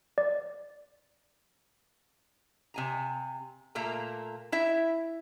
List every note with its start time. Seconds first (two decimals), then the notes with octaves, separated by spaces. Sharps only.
0.18 D5
2.74 C3 G#5 A#5
3.75 A#2 A3 A#3 A#5
4.52 E4 E5